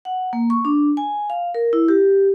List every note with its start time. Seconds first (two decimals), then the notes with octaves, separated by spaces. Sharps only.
0.05 F#5
0.33 A#3
0.50 C#6
0.65 D4
0.97 G#5
1.30 F5
1.55 A#4
1.73 E4
1.88 G4